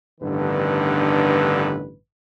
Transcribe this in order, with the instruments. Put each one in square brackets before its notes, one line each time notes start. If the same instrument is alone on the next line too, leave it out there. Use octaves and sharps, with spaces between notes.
[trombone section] A1 G2 D3 D#3 B3 B4